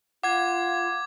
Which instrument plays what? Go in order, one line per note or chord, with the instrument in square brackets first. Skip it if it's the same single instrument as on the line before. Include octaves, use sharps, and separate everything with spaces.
[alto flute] F4 [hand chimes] F#5 [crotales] D6 G#6